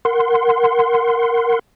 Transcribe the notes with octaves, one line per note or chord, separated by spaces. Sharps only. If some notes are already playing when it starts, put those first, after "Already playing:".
A#4 F#5 C6